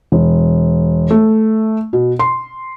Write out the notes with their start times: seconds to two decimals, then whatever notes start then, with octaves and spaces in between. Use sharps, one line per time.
0.12 E1
1.10 A3
1.93 B2
2.19 C6